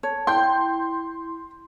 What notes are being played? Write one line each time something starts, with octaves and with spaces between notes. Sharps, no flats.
C#5 A5
E4 G5 C6 G6